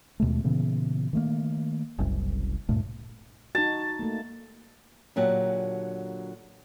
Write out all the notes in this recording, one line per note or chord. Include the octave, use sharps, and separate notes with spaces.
D#2 B2 G#3 A3
A#2 C#3 E3 B3
D#3 A3 A#3
F#1 C2 F#2
D2 G2 A#2 A3
D#4 F#4 A5
A3 A#3
A#2 D3 F#3 G4 F#5 A5